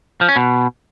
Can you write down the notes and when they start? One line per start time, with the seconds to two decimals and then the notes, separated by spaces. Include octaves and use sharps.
0.21 F3
0.28 C#4
0.36 B2